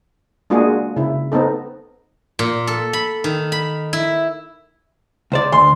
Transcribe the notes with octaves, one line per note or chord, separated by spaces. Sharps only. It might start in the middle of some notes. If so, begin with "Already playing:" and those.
G#3 A#3 D4 F4 F#4 G#4
C#3 E4
B3 C4 D#4 A4
A#2
A4
B5
D#3
B5
E4
C#2 C5 D5
D2 C6